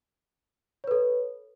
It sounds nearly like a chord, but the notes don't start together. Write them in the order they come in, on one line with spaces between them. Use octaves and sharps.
C#5 B4 A4